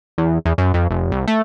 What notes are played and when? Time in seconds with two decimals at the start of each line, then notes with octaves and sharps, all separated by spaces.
0.18 E2
0.46 E2
0.58 F#2
0.74 F2
0.90 F1
1.12 C2
1.28 A3